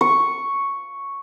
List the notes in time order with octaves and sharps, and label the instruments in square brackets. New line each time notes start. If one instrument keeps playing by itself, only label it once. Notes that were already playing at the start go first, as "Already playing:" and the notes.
[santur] C#6